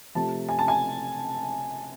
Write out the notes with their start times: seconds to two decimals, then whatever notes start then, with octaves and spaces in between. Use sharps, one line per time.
0.15 C3 F3 A3 A5
0.49 G#5
0.59 A5
0.68 G#5